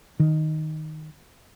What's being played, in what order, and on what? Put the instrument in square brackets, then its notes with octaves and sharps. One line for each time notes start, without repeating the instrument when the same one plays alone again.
[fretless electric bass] D#3